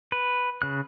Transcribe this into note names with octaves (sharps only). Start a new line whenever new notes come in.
B4
C#3 F#6